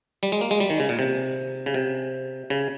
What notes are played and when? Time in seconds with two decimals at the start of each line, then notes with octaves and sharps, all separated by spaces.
0.23 G3
0.32 G#3
0.41 A#3
0.51 G#3
0.60 G3
0.70 D#3
0.80 C#3
0.89 A#2
0.99 C3
1.66 C#3
1.74 C3
2.50 C#3